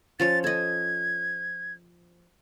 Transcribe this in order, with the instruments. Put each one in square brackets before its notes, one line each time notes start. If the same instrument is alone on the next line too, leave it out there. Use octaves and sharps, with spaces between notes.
[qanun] F3 C#4 C#5 [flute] A6
[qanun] A4 D#5 [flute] G#6